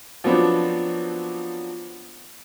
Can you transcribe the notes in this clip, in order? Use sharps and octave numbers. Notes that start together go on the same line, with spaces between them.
F3 F#3 B3 C4 D4